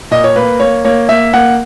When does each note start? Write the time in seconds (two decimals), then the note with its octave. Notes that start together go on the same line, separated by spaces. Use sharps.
0.11 A#2 D#5
0.24 C#5
0.36 A#3 B4
0.60 A#3 C#5
0.85 A#3 C#5
1.09 A#3 E5
1.33 A#3 F#5